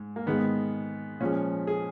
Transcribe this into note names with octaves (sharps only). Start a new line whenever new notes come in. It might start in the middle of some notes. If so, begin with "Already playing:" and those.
Already playing: G#2
A#3
G#2 D#3 G#3 B3
A#2 F3 G#3 C#4
G#4